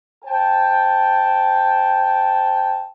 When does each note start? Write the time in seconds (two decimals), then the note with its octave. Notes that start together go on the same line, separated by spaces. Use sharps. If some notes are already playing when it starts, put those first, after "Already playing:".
0.25 C5 G5 A5